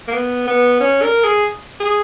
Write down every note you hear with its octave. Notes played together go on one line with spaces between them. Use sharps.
A#3
B3
B3
C#4
A#4
G#4
G#4